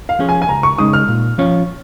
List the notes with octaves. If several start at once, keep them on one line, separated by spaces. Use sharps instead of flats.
F5
F3 C#4 G#4 C#5
G#5
G#5
C#2 A#5
C#6
C#3 G#3 D#4 D#6
F6
A#2
F3 C#4 F4 C#5